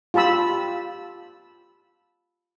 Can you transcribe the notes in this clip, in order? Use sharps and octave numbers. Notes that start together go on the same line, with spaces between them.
F4 G4 A5 B5 E6